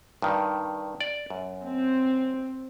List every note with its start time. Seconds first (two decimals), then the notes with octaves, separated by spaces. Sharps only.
0.22 G2 D#3
1.01 D5
1.30 F#2
1.65 C4